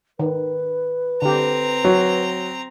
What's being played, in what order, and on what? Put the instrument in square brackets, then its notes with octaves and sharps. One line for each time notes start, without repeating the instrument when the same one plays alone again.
[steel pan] D#3 [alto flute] B4
[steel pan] D3 G4 [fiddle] C4 A#5
[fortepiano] F#3